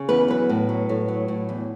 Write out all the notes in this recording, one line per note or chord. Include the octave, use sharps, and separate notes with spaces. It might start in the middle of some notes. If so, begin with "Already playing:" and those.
Already playing: C#3
E2 B4
F#3 B4
A2
F#3
A2
F#3
A2
E2